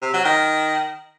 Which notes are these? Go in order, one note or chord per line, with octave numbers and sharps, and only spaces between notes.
C3
F#3
D#3